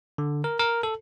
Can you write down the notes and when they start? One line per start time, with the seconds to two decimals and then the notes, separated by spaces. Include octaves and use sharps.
0.18 D3
0.44 A#4
0.59 A#4
0.83 A4